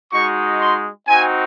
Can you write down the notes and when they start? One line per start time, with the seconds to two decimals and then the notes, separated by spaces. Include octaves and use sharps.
0.11 G#3 D#4 F#4 C#6
0.59 C6
1.07 C4 D#4 F#4 G#5